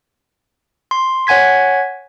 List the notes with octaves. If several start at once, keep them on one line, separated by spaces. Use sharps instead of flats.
C6
C#5 F#5 G#5 G#6 B6